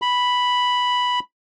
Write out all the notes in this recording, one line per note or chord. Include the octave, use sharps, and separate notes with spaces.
B5